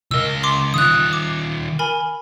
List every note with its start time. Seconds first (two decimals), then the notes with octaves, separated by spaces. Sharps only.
0.11 C#2 A#4 D#5 E6
0.43 C6 D6
0.74 D#3 F4 D#6 F#6
1.13 D6
1.79 A#4 G#5 B5